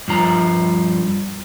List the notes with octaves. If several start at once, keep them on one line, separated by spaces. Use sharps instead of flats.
G2 F3 A#5